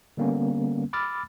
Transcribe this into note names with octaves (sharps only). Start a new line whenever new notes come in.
D3 G3 A#3 B3 C#4
B5 D6 E6 F6 A6